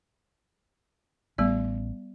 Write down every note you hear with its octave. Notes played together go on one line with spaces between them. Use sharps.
A1 G3 B3 D5